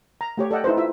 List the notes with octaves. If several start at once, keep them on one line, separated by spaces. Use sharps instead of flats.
A#5
A3 G4 C#5
A4 D5 D#5 F#5 G5
D#4 E4 A4 B4 C5
E4 F4 E5